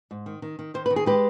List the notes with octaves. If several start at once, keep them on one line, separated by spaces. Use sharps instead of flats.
G#2
D#3
D#3
D#3
D#3 C5
D#3 B4
G#4
G#3 G4 B4